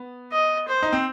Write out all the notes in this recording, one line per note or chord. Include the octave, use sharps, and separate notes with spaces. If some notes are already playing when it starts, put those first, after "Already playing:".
Already playing: B3
D#5
C5
D#4
C4